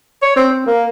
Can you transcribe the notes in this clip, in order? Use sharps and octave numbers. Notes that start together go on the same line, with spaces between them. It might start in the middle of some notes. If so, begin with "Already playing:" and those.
C#5
C4
C4
A#3